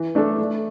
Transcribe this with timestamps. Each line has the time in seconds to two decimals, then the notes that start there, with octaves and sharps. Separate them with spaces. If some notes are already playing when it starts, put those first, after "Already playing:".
Already playing: E3
0.15 A3 D4 A4
0.38 A3